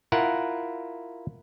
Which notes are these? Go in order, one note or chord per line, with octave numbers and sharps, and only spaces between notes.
E4 F4 A#4 F#5